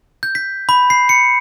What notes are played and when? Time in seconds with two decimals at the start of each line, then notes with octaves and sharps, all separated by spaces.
0.23 G6
0.35 B6
0.69 B5
0.90 C7
1.09 C#7